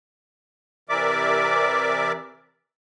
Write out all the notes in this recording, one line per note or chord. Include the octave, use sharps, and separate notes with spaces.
C3 E3 A#4 D5 E5 D6